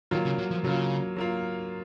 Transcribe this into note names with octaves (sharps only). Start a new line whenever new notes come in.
D#3 F#3 A#3 F4
C#3
F#3
F3
C#3 F#3 A#3 F4
F#3 A#3 F4